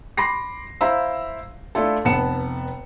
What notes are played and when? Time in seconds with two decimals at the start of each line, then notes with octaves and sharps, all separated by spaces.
0.17 B5 C6 D6 A#6 C7
0.81 E4 C5 F5 A#5 B5 E6
1.75 A3 D4 E4 F4 A4
2.05 F1 B3 F#5 A5 C#7 E7